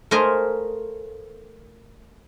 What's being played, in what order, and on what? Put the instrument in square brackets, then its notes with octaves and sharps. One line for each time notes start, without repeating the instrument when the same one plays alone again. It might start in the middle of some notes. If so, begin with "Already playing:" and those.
[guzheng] A3 A#4 C5 D#5 F5 G#5